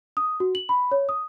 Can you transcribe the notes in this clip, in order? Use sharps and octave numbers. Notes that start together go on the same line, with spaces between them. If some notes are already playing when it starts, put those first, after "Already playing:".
D#6
F#4
F#7
B5
C#5
D#6